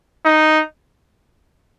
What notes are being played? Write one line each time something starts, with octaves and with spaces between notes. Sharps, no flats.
D#4